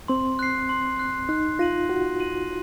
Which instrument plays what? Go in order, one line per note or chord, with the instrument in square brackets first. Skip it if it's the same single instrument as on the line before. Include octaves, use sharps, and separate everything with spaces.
[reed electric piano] C4 [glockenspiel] C6
[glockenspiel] F#6 C7
C6
F#6 C7
[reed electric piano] D#4 [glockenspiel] F#6
[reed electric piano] F4 [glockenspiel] A#6 D#7 F#7
[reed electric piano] F#4 [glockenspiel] F#6
[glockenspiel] A#6 D#7 F#7